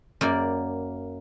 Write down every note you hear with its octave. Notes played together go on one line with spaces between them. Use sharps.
F#2 A#3 D5